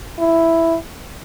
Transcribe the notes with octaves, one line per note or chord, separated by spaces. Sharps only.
E4